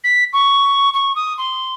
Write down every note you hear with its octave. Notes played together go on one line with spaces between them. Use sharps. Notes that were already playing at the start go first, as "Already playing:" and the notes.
B6
C#6
C#6
D#6
C6